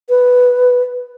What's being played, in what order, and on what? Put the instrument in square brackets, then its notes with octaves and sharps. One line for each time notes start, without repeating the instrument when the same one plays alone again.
[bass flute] B4